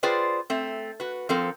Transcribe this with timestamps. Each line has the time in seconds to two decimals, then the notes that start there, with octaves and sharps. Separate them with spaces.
0.03 F4 G#4 B4 C5 D5 G5
0.50 A3 C4
1.00 F#4 B4
1.29 F3 C4 A4 A#4